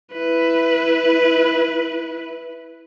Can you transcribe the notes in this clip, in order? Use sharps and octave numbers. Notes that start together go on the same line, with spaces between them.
E4 B4